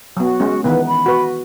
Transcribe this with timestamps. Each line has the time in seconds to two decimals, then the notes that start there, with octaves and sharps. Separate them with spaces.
0.17 F#3 B3 F#4
0.40 G#3 C#4
0.64 D#3 E3 B3 B4
0.87 B5
1.06 F#4 B4